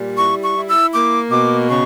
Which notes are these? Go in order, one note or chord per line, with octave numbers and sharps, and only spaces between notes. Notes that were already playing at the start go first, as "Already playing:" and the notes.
Already playing: A#2 G3
E4 C#6
C#6
E4
E6
A#3 D6
B2 D6
C#3 C#6